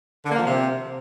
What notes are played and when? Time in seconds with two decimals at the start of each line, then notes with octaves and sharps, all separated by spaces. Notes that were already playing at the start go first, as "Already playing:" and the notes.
0.25 D3
0.32 A#3
0.39 F3
0.46 C3